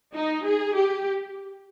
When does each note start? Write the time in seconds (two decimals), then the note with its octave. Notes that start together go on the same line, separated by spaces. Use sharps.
0.13 D#4
0.44 G#4
0.74 G4